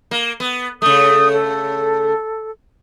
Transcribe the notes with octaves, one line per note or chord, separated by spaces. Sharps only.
A#3
B3
C#3 A3 D#6
A4